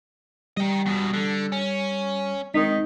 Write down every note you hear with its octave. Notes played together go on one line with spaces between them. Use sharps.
G3 D#5 G5
E2 B2
D3
C#4
D#3 G#3 C4 D#4 B6